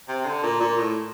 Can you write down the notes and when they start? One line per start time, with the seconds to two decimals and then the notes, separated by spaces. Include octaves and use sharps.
0.08 C3
0.26 D3
0.43 A#2
0.60 A#2
0.78 A2